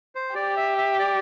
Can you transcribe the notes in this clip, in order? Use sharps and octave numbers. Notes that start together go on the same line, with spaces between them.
C5
G4 D5
E5
E5
D5